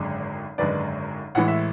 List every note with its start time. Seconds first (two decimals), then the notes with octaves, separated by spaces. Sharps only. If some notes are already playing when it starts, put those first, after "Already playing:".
Already playing: G#1 F#2 D3 G#3
0.58 G#1 F#2 D3 G#3 B4 D5
1.35 A1 A2 E3 G#3 F#5
1.48 E5